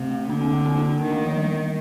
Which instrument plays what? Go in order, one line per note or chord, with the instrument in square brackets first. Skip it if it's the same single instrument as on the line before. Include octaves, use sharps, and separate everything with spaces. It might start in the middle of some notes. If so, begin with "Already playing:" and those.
Already playing: [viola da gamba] C3 [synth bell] A3
[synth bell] A3
[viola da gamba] D3 [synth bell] A#3 D4
[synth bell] C4
A#3
C4
A#3 D4
A#3 D4
[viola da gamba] D#3 [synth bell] A#3
[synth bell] A3
F3
G3
G3